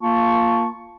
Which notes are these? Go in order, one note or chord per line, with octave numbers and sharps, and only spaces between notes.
A#3 F4 A5 C#6